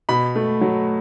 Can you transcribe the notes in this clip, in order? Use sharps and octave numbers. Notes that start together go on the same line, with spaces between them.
B2 B5
A3
F#3